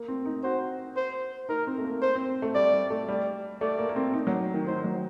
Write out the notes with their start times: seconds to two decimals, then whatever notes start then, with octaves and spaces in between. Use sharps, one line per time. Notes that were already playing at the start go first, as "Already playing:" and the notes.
Already playing: A#3
0.08 C4
0.26 D#4
0.43 F#4 C5
0.96 C5
1.49 D#4 A#4
1.67 C4
1.78 A3
1.84 A#3
2.02 C5
2.15 C4
2.42 A3
2.55 G3 D5
2.73 G3
2.90 A3
3.08 G3
3.61 A3 D5
3.79 A#3
3.89 A#3
3.96 C4
4.14 D#4
4.27 F#3
4.54 D#3
4.67 D#3 C5
4.84 F#3